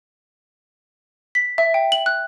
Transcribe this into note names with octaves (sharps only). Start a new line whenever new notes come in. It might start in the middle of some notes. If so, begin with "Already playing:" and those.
B6
E5
G5
F#7
F#6